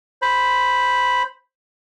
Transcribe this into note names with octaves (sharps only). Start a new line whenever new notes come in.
C5 B5